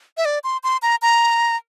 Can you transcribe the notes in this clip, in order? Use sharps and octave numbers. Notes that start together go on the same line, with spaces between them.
E5
D5
C6
C6
A#5
A#5